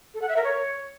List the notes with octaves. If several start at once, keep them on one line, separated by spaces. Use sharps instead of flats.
A4
F#5
E5
A#4
C#5